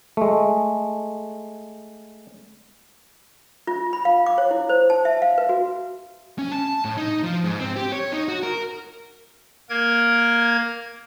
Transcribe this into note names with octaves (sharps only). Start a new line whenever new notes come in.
G#3 A3
F4
B5
F5
D6
C#5
E4
C5
A5
E5
F5
B4
F#4
C#4
A5
A2
D#4
F3
G#2
C4
G4
C#5
D#4
F#4
A#4
A#3 A#4 G#6